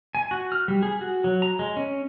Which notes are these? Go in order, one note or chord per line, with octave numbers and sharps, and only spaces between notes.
G#5
F#4
F6
G3
G#4
F#4
F#3
A#5
G#3
C#4